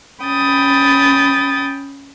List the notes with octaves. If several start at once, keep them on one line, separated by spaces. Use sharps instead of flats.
C#4 G5 B5 D#6 A6